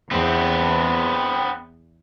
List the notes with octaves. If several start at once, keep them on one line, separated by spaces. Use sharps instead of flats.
E2 B3 C4